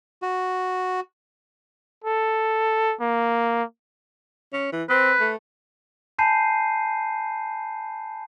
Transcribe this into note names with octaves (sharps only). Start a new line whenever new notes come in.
F#4
A4
A#3
C#4
E3
C4 B4
A3
G#5 A5 B5 G6 C7 D#7